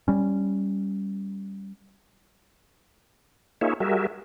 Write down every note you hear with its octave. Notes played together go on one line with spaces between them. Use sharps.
G3 C#4
A#3 D#4 F4 G#4 C#5 E5
G3 F#4 G#4 A#4 E5